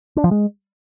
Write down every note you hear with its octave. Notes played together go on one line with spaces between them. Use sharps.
D4
F3
G#3